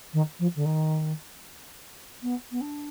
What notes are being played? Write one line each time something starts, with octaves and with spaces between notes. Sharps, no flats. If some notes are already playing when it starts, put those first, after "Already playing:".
D#3
F3
D3
D#3
B3
B3
D4